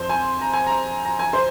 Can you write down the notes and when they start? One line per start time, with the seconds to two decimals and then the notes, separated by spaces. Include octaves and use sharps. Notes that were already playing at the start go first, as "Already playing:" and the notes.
Already playing: F2 F3 C5
0.09 G#5
0.41 A#5
0.53 G#5
0.67 A#5
1.05 A#5
1.19 G#5
1.33 C5